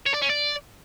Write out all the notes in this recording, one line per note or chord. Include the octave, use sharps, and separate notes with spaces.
C#5
D5
C#4
D5